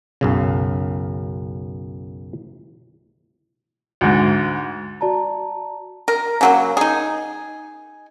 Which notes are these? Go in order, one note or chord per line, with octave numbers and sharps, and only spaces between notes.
B1 F#2 C#3
D2 G#2
F#4 D5 A5 A#5
A#4
C#3 F#3 A#3
D#4 G#4